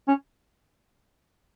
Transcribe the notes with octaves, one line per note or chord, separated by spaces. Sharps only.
C#4